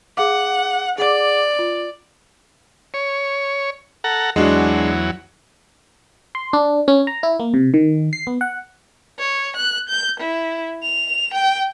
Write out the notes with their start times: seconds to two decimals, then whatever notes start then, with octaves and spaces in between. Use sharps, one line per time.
0.17 G#4 F5 F#5 D6
0.98 G#4 D5 F#5 D6
1.59 F4
2.94 C#5
4.04 A4 F#5 A#5
4.36 E2 F#3 G#3 D4 F#4
6.35 C6
6.53 D4
6.88 C#4
7.07 A#5
7.23 E4
7.40 A#3
7.54 C3
7.74 D#3
8.13 C7
8.27 B3
8.41 F#5
9.19 C#5
9.57 F#6
9.89 G6
10.20 E4
10.83 F7
11.34 G5